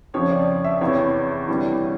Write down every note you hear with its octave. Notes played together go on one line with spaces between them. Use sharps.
F2 C#3 F3 C#5
D5
E5
E2 C3 E3 C#5
D2 C3 E3 G3